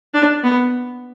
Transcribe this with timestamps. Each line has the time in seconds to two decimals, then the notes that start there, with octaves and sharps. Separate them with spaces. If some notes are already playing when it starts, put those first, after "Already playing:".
0.14 D4
0.44 B3